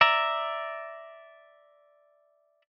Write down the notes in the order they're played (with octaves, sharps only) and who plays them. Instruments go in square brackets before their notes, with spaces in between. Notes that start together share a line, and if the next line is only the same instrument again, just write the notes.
[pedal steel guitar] D5 E5 A#5